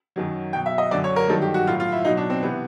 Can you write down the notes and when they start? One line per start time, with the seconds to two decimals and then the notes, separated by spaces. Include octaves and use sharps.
0.16 F#2 D#3 F#3
0.53 B2 F#3 G5
0.66 E5
0.78 D#5
0.91 F#2 D3 F#3 D5
1.04 C#5
1.16 A#4
1.29 G2 D#3 F#3 A4
1.42 G4
1.54 F#4
1.67 A2 F#3 F4
1.80 F4
1.92 E4
2.05 B2 F#3 D#4
2.17 D4
2.30 C4
2.43 C3 E3 B3